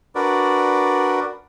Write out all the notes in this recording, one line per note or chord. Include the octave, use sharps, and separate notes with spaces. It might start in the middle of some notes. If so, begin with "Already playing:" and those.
D4 F#4 A#4 B4 D5